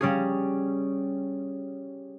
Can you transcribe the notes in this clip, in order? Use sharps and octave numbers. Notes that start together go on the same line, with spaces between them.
G3 C#4 G#4